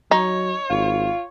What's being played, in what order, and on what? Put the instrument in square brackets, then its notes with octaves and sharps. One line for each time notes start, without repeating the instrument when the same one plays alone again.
[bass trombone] F#3 [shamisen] D#4 [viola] C#5
[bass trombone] G#1 [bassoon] F4